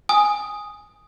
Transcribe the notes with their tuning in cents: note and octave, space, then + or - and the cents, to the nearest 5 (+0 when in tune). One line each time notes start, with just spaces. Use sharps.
G#5 +0 D#6 +0